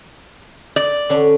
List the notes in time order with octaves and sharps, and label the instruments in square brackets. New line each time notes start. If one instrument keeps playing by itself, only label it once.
[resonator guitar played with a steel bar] D5
[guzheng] D3 C#4 D4